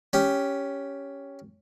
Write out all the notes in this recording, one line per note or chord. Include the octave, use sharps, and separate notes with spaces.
C#4 G4